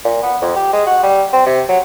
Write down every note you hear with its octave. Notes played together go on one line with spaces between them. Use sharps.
A#2
B3
F2
G4
G#3
F#4
G3
C4
C3
F#3